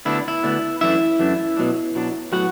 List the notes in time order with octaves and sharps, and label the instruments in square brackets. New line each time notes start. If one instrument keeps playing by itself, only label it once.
[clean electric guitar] D2 D3 B3 D4 E4
E4
D2 D3 B3 D4
F#2 E3 A3 D4 E4 E5
F#2 E3 A3 D4
B2 F#3 D4
B2 F#3 D4
A2 F#3 B3 F#4 F#5